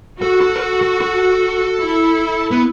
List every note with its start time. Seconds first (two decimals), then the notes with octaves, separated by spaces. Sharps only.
0.21 F#4 A4
0.41 A4
0.55 B4
0.62 A4
0.82 A4
1.01 A4
1.81 E4
2.51 B3